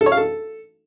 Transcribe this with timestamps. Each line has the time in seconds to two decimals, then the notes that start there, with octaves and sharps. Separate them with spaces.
0.01 A4
0.06 C#5
0.12 F5
0.17 A4